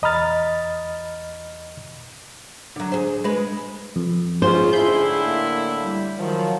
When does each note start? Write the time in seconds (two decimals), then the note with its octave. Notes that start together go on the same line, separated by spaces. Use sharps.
0.02 E2 D#5 A#5 B5 F6 A6
2.76 D3 F#3
2.92 G#4 C5
3.24 G#3 B4
3.96 F2
4.42 G#2 C#4 F4 G#4 C5
4.73 A2 D3 E4 B5 C6 G6
5.24 A#3
5.82 G3
6.18 D#3 F3 F#3